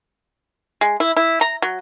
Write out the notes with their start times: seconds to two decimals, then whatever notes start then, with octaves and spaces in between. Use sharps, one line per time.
0.81 G#3
1.00 E4
1.17 E4
1.41 A#5
1.62 F#3